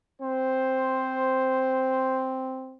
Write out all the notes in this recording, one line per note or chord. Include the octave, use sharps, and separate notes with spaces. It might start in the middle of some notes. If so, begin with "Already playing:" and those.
C4 C5